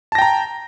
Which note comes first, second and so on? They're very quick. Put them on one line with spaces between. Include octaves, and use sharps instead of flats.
A5 A#6 G5 A#5